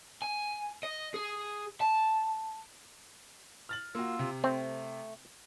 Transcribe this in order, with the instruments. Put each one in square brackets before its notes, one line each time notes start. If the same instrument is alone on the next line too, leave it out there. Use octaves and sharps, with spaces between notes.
[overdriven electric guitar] G#5
D#5
G#4
A5
[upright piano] F6 A6 F#7
[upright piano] A#3 F#4 [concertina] F4 E6
[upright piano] C3
[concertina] A3 [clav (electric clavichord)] C4